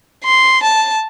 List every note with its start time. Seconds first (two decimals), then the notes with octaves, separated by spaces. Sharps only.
0.24 C6
0.63 A5